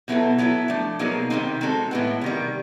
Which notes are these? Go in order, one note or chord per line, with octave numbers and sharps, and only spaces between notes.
B2 F#3 B3 E4 A4
F#3 B3 E4 A4
F3 A3 D4
B2 F#3 A#3 D#4 G#4
C3 D#3 G#3 C4 D#4
G#3 C4 D#4 F#4 A4
A2 E3 G#3 B3
C3 D#3 G3